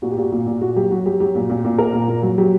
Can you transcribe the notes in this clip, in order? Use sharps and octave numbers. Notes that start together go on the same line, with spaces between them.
A#2 F#4
G4
A#2 F#4
A#2
A#2
A#2 F#4
F#3 G4
F#3 F#4
F#3 G4
F#3 G4
A#2
A#2
A#2
A#2 A#4
A#2
A#2
F#3
F#3 G4